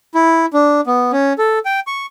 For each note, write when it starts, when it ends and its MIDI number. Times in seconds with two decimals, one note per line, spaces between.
0.15 0.46 64
0.53 0.81 62
0.87 1.12 59
1.12 1.33 61
1.38 1.59 69
1.65 1.80 79
1.87 2.06 85